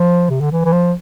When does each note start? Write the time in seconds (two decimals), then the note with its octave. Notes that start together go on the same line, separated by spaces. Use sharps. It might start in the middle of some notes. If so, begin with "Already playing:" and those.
Already playing: F3
0.30 C3
0.41 D3
0.52 E3
0.65 E3
0.72 F3